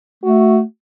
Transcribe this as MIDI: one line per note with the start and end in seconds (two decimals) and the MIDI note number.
0.24 0.62 57
0.24 0.60 66